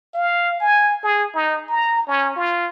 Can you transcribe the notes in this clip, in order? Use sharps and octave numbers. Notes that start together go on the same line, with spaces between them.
F5
G#5
G#4
D#4
A#5
C#4
F4